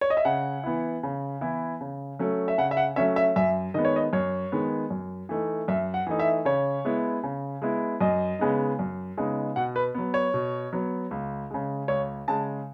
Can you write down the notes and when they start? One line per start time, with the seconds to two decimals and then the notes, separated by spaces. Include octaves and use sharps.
0.01 C#5
0.10 D#5
0.17 E5
0.25 C#3 F#5
0.64 E3 B3 E4
1.03 C#3
1.41 E3 B3 E4
1.81 C#3
2.19 F#3 A3 C#4
2.48 E5
2.58 C#3 F#5
2.71 E5
2.77 F#5
2.96 F#3 A3 C#4 E5
3.16 E5
3.36 F#2 E5
3.74 D#3 G#3 B3 D#5
3.85 C#5
3.96 D#5
4.13 F#2 C#5
4.52 D#3 G#3 B3
4.90 F#2
5.29 E3 A3 D#4
5.68 F#2 E5
5.94 F#5
6.07 E3 A3 D#4
6.19 E5
6.45 C#3 C#5
6.85 G#3 B3 E4
7.23 C#3
7.62 G#3 B3 E4
8.01 F#2 D#5
8.39 C#3 G#3 B3 D#4
8.79 F#2
9.17 C#3 G#3 B3 D#4
9.56 B2 F#5
9.76 B4
9.94 F#3 B3
10.14 C#5
10.34 B2
10.73 F#3 B3
11.11 C#2
11.50 C#3 G#3
11.88 C#2 C#5
12.28 C#3 G#3 A5